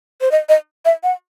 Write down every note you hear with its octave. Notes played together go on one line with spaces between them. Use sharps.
C5
D#5
D#5
E5
F#5